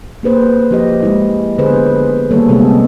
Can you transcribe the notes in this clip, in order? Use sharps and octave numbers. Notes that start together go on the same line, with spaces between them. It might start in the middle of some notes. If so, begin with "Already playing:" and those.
A#3 G#4 B4 C5
F3 G4 D#5
G#3 E4
D3 B3 G#4 B4 C5
D#3 G3 A#3 G#4 A4 C#5
C3 G#3 B3 G#4 A4